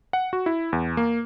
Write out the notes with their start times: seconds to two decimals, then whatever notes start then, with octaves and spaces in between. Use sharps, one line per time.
0.13 F#5
0.33 F#4
0.46 E4
0.73 E2
0.97 A#3